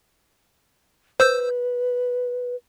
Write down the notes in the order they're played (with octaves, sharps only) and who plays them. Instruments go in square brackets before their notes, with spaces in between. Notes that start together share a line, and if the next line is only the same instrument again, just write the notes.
[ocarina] B4 [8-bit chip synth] C5 E6 G6